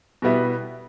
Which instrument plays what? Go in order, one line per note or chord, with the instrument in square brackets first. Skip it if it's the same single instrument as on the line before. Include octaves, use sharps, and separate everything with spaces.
[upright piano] B2 G3 B3 E4